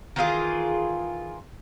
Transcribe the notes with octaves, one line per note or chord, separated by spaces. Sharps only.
D#3 E3 F4 G#4